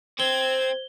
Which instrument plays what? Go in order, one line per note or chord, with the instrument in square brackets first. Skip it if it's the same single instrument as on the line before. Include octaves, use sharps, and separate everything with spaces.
[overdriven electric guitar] C4 [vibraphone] C5 [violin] G#6 [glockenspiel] G7